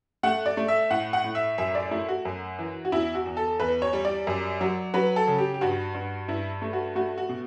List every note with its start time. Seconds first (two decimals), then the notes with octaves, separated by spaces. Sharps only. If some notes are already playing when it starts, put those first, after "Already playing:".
0.23 A3 F#5
0.46 D5
0.57 A3
0.68 E5
0.90 A2 F#5
1.13 F#5
1.24 A2
1.35 E5
1.58 F#2 E5
1.75 D5
1.91 A3 E4
2.08 F#4
2.25 F#2
2.59 E3
2.85 F#4
2.92 E2 E4
3.15 F#4
3.26 E2
3.37 A4
3.59 E2 B4
3.82 C#5
3.93 G3
4.05 D5
4.27 F#2
4.61 F#3
4.94 F#3 B4
5.16 A4
5.27 C#3
5.38 G4
5.54 G4
5.61 G2 F#4
5.94 G2
6.28 G2 E4
6.62 A3
6.73 F#4
6.95 A3 F#4
7.18 F#4
7.29 B2